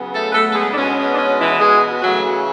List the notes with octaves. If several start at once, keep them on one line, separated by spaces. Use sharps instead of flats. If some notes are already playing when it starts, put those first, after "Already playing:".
Already playing: C#3 F#3 B3
A3 A4
B4
A3 A4
A4
G#3 G#4
D4
B2 G#3 B3 C#4
C#4
D4
C#4
E3 E4
G#3 G#4
C#3 E3 F#3 A3 F#4